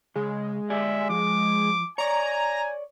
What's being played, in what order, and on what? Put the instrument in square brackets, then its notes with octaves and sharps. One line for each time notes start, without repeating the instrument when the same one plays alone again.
[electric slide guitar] C#3 [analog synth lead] G#3
[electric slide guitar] G4 D5 G#5 [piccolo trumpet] E5
[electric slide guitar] F3 [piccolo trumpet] D6
[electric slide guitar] C#5 D5 [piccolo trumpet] G#5 [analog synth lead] A#5